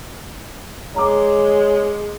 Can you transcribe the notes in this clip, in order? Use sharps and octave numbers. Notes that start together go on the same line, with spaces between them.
G#3 C#5 A#5 D6